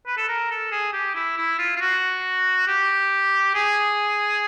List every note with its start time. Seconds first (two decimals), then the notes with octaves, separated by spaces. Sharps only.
0.07 B4
0.17 A4
0.28 A#4
0.51 A4
0.72 G#4
0.93 G4
1.15 E4
1.38 E4
1.58 F4
1.76 F4
1.81 F#4
2.67 G4
3.55 G#4